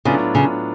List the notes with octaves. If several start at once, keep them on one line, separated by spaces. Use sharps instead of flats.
A2 C#3 F#3 B3 D4 F4
C#3